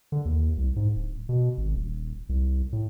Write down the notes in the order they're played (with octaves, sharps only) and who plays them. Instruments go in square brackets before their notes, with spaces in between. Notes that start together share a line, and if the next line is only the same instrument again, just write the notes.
[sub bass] D3
D#2
C2
G#2
D1
B2
G#1
D#1
C2
A2